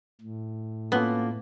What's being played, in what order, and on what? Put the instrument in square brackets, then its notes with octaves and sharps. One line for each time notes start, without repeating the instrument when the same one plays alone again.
[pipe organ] A2
[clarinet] A#3 [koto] B3 [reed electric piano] C#4 F4 A4